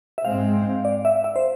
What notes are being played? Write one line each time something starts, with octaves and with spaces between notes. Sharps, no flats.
E5
G#2 G#3 C4 F5
D5
E5
E5
C5